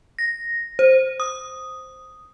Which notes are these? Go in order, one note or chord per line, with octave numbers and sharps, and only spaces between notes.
A#6
C5
D#6